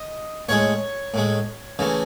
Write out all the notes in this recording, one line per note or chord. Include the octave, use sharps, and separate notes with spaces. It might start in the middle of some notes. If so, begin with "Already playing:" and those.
Already playing: D#5
A2 G#3 C#5
A2 G#3
C#3 E3 A3